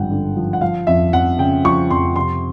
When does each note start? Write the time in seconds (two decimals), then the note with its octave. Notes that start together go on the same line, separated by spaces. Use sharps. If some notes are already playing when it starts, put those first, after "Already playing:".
Already playing: G#1 G2 D3 F3 F#5 G5
0.11 D3
0.36 F3
0.53 F#5
0.61 F3 F5
0.87 F2 E5
1.13 F2 F#5
1.38 C#3 G5
1.65 F3 C#6
1.90 F2 C6
2.16 C3 C6